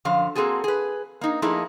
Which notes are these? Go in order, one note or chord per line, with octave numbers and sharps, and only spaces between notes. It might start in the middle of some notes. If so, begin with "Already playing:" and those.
F#2 D3 F3 F5
A#3 C4 F#4 G#4 A4
G#4 B4
A#3 D#4
F3 A3 A#3 D#4 E4 G#4